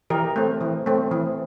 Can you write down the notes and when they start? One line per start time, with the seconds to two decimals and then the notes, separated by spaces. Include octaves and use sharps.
0.10 E3 G4 A#4
0.36 A3 C4
0.61 E3
0.86 A3 C4
1.11 E3